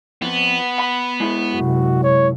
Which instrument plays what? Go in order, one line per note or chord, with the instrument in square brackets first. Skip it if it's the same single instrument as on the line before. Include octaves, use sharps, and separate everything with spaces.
[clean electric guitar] F2 [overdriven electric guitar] B3
[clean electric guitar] B5
G#3 E4
[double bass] F#2 C3 [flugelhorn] F#4
[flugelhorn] C#5